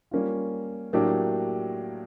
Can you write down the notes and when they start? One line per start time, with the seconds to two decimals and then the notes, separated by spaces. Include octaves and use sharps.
0.11 G3 A#3 C#4 F4
0.93 A2 F#3 A#3 D4 G4